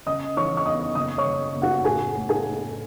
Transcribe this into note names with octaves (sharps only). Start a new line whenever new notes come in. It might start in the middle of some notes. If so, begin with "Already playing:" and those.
C#3 D#5 D#6
E3 C#5 C#6
C#6
E2 D#5 D#6
F#1 D#5 D#6
C#5 C#6
F#1
F#1
F#4 F#5
A2 G#4 G#5
A2
G#4 G#5
A2